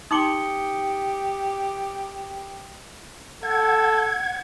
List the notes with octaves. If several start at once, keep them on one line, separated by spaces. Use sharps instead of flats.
D#4 G4 C6 D6 D#6 C#7 G7
A4 F#5 G#6